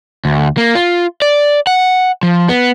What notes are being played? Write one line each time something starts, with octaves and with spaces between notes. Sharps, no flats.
D2
A#3
F4
D5
F#5
F3
B3